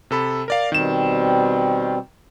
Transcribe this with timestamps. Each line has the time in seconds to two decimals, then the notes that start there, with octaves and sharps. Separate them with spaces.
0.11 C3 A4 B5
0.48 A#4 D5 F5
0.72 B2 D#3 G3 C4 E7